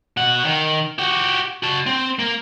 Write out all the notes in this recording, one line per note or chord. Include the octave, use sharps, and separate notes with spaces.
B2 F#5
D#3
F#4 G4
F#4 A5
C4
A#3